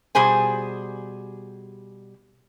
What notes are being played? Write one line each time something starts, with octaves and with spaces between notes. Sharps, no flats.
B2 G3 G#4 C5 G#5